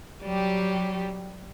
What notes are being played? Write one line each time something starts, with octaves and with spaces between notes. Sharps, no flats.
F#3 G3 G4